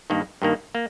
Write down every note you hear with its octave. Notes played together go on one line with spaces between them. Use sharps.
G2 D#3 A#3
G2 D#3 A#3
A#3